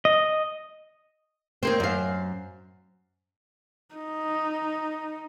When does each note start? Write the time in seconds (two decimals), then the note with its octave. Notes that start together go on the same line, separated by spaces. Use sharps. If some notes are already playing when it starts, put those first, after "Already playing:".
0.05 D#5
1.63 D#3 A#3 C4
1.80 F#2 F5
3.95 D#4